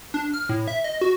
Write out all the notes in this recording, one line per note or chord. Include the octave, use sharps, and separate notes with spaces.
D4
F6
A2
E5
D#5
F#4